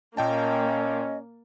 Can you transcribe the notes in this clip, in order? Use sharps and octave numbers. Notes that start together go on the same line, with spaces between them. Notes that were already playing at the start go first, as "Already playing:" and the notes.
A#2 A#3 C#4 D#5 G5 A5